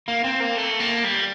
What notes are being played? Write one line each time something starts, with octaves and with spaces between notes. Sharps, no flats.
A#3
C4
A#3
A3
A#3
G3